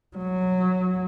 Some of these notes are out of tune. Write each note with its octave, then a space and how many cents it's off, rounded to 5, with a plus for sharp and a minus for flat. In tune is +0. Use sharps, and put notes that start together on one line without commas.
F#3 -10